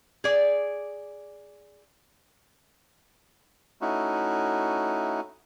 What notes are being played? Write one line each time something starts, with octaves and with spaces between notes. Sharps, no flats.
G#4 D5
A3 C#4 D#4 E4 F#4